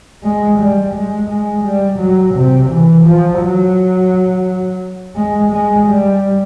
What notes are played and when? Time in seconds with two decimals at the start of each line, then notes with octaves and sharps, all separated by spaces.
0.23 G#3
0.59 G3
0.94 G#3
1.29 G#3
1.64 G3
1.99 F#3
2.35 C3
2.70 E3
3.05 F3
3.41 F#3
5.16 G#3
5.52 G#3
5.87 G3